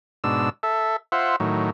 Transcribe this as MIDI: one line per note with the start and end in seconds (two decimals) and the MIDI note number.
0.24 0.50 44
0.24 0.50 47
0.24 0.50 62
0.24 0.50 88
0.63 0.96 69
0.63 0.96 76
1.12 1.36 65
1.12 1.36 72
1.12 1.36 76
1.12 1.36 78
1.40 1.70 45
1.40 1.70 51
1.40 1.70 54